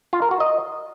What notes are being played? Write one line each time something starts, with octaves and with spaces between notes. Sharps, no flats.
F4
A#4
F#4
D#5